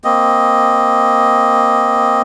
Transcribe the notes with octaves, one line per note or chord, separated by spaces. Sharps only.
A#3 C4 D#5